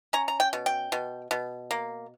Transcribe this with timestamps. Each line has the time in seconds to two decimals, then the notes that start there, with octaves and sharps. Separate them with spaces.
0.13 C#4 A#5
0.28 A#5
0.40 G5
0.53 B2
0.66 G5
0.92 B2
1.31 B2
1.71 A#3